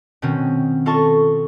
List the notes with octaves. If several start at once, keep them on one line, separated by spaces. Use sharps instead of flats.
B2 D#3 C4 C#4
F4 A4 D#5 A5 C#6